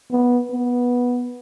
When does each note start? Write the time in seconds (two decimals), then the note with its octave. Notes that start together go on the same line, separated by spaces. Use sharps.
0.11 B3
0.51 B3